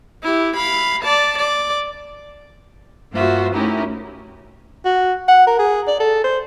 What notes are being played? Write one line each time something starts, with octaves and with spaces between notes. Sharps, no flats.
E4 G4
F5 B5
D5 A5
D5
G2 A#3 F4 F#4 C5 E5
A3 C#4 D#4 E4 G4 A#4
F#4
F#5
A#4
G#4
D5
A4
C5